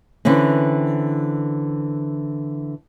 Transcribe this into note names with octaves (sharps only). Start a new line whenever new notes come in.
D3 E3 C4 C#4